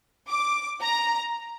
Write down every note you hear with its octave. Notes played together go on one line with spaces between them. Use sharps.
D6
A#5